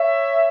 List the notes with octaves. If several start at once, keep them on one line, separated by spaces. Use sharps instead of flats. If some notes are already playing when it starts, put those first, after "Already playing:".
Already playing: C#5 E5